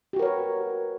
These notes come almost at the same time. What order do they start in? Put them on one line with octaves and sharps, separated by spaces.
G4 F#4 A#4 C#5 B4